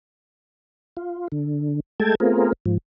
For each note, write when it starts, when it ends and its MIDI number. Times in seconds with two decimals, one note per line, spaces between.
0.97 1.28 65
1.32 1.80 50
2.00 2.15 56
2.00 2.15 57
2.00 2.15 69
2.00 2.15 79
2.00 2.15 81
2.00 2.15 92
2.20 2.53 57
2.20 2.53 59
2.20 2.53 60
2.20 2.53 65
2.20 2.53 68
2.20 2.53 70
2.66 2.78 44
2.66 2.78 53